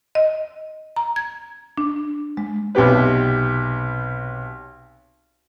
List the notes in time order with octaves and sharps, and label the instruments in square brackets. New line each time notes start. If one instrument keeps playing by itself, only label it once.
[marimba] D#5
A#5
G#6
D4
G#3
[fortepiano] B1 C3 G4 B4